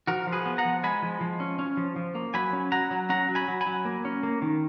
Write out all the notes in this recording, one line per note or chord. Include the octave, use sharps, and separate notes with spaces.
F3 F#4 A#4
F3
G#4 B4
B3
F#5 A#5
F3
G#3 G#5 B5
F3
F3
C#4
C#4
F3
F3
A#3
F#3 G#5 B5
C#4
F#3 F#5 A#5
F#3
C#4 F#5 A#5
F#3
G#5 B5
F#3
G#5 B5
F#3
A#3
C#4
A#3
D#3